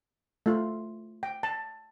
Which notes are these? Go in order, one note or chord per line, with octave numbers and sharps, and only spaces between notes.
A3 F4
G5
A5